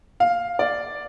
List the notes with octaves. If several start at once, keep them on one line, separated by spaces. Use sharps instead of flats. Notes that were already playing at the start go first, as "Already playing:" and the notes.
F5
D5